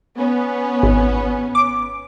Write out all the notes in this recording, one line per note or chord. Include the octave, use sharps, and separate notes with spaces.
B3 C#4
G#1
D6